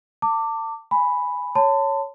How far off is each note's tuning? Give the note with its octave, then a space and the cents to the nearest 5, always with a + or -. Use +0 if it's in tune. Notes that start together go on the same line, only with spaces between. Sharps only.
A5 +35 D6 +0
G#5 +0 B5 +0
C#5 +0 A5 +20 C6 -45